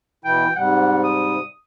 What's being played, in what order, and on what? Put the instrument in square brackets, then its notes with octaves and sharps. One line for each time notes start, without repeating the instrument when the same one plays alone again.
[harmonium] B2 E3 E4 [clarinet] G5
[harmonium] G#2 C3 G3 [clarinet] F#5
[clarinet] D#6